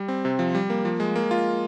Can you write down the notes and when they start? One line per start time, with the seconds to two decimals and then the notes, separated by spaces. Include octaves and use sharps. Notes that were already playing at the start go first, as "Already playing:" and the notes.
Already playing: G3
0.08 C4
0.25 C3
0.39 F3
0.55 G3
0.70 A#3
0.85 F3
1.00 G#3
1.16 A#3
1.31 F4